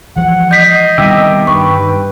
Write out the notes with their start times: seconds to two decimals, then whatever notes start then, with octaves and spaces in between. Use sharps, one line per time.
0.16 E3 F3 G#3 F#5
0.51 D#5 G6 B6 C7
0.98 D#3 G3 B3 C4 G4 E5
1.47 G2 B4 C#6